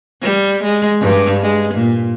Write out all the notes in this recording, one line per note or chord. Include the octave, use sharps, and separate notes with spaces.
G3
G#3
G2
G#3
A#2